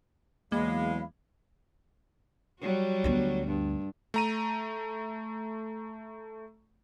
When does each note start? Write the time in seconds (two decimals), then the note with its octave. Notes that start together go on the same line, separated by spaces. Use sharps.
0.52 E2 F#3 G#3 A#3 F5 B5
2.60 F#3 G3 F#4
3.04 D2 B3
3.47 G2
4.14 A3 A#5 D#7